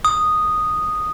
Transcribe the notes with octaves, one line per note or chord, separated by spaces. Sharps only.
D#6